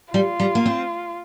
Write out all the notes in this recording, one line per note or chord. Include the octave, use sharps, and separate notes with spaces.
G3 F4
G3
A#3
C4